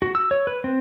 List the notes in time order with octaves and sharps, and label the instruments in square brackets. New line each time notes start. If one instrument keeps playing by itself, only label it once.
[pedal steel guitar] F#4
E6
C#5
B4
C4